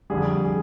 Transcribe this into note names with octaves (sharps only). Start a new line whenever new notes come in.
F2 D3 G3 G#4
G#4